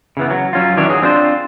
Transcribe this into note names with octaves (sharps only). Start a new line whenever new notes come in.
C#3 E3 B3
F#3
F#3 C#4 F4
D#3 E3 D4 C#5
F#3 G#4
C4 D4 F4 C5